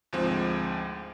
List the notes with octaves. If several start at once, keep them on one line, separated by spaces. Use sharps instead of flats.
D2 G#2 F3 G#3 C4